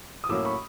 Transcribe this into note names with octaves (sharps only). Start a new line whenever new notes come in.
D#6
A2 F#3 A#3 C#4 D6 E6
B5 C#6